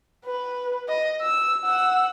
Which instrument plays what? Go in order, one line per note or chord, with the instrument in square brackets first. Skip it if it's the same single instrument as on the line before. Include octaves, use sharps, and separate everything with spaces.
[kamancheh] B4
D#5
E6
F#5 E6